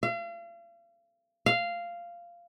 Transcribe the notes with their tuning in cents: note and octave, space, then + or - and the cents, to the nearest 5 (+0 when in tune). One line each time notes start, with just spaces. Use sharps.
F5 -40
F5 -10